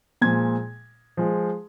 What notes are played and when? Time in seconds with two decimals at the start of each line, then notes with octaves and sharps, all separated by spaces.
0.21 A#2 F3 G#3 G#6
1.17 F3 G#3